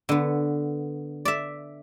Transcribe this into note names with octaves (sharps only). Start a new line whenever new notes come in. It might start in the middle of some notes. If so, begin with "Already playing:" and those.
D3 B3
D5 E5